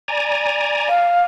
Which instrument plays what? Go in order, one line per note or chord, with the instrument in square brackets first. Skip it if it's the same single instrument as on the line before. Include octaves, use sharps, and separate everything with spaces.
[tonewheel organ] D5 G#5 A#5
[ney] F5